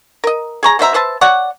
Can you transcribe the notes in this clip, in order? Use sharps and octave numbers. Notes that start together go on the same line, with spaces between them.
A#4 D#5
G#4 C#5 A#5
B2 C5 E5 A#5
B4 C5 E5 A5
C#5 D5 F#5